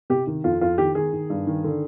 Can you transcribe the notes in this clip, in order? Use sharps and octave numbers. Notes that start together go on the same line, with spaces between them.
C3 G4
D#3
F2 F4
F2 F4
D#3 G4
D#3 G#4
D#3
G2
D#3
D3